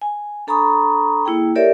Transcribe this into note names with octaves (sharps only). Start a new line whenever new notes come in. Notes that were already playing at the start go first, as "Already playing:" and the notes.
G#5
D4 A4 A#5 B5 C#6 D#6
A#3 E4 G#4 G5
G4 A4 A#4 C#5 D5 E5